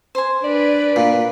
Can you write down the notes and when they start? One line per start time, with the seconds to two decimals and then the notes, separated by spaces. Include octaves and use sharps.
0.15 C5 G#5
0.44 D4 B4 D5
0.96 A#2